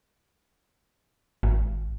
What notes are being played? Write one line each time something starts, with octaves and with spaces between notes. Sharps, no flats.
G#1